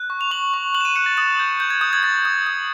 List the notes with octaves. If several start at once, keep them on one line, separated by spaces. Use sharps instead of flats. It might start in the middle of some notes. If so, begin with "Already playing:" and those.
Already playing: F#6
C#6
F7
C#6 F#7
C#6
F#6 F#7
E7
D#7
F#6 C#7
A6
D#6 A6
G6
G6
G#6
D#6 G6
G#6
G6 A6
D#6
D#6